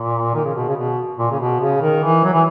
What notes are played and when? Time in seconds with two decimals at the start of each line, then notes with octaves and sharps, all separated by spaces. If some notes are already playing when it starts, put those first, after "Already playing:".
Already playing: A#2
0.34 D#3
0.44 C#3
0.55 B2
0.68 C#3
0.76 B2
1.18 A#2
1.31 C#3
1.39 B2
1.60 C#3
1.81 D#3
2.03 E3
2.24 F#3
2.33 E3